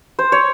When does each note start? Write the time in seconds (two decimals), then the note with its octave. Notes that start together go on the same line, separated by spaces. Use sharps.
0.19 C5
0.32 C#5